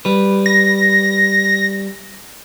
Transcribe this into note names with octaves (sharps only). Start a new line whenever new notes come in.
G3 B4
A#6